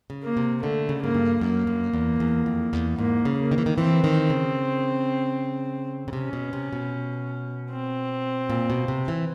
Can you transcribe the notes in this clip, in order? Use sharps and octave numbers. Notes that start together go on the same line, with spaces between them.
C#3
A#3
C3
D3 A3
C#3
G#2 A#3
G2
F#2 A#3
F#2
E2
E2
F2
E2
G#2 A#3
C#3
A#3
D#3
E3
D#3
E3 C4
D#3
C#3
C#3
C3 C#4
B2
C3
B2
C4
A#2
B2
C3
E3